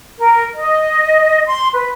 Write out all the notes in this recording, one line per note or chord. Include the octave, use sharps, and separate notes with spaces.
A#4
D#5
C6
B4